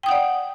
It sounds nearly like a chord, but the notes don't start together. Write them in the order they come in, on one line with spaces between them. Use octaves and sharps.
G5 D#6 F#5 D5